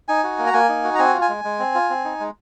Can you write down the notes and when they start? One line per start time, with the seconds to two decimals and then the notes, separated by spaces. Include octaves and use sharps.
0.08 D#4 G#5
0.24 F#4
0.39 A#3
0.47 A#5
0.54 A#3 G#5
0.69 D#4
0.84 F#4
0.95 A#5
0.99 C4 G#5
1.14 F4
1.22 G#5
1.29 G#3
1.44 G#3
1.59 C4
1.75 F4
1.90 C4
2.05 D#4
2.20 G#3